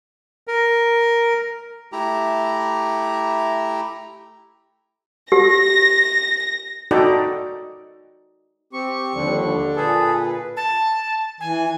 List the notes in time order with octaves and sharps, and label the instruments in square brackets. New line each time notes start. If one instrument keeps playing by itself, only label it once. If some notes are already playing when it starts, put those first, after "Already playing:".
[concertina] A#4
A3 E4 G4 A#5
[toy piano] G4 [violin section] A#6
[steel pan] D#4 F#4 A4 D5 G5
[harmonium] C4 G4 [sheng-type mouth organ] C#6
[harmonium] D#2 F3 G3 [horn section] D3
[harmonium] A#2 B4 [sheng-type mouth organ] G#4 A4
[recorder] A5
[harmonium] E3 [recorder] G#5